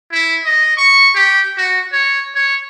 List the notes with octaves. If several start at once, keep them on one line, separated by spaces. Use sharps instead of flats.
E4
D#5
C#6
G4
F#4
C#5
C#5